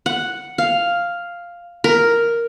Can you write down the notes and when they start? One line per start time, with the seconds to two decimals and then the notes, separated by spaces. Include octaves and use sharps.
0.06 F#5
0.58 F5
1.84 A#4